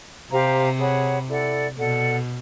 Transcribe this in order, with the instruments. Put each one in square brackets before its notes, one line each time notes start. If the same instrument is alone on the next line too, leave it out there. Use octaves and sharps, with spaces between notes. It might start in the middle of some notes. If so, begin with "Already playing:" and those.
[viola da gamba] C3 [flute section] G4 C5 F5 A#5
[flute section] G#4 C#5 F#5 B5
E4 A4 D5 F#5
[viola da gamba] B2 [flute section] A4 D5 F#5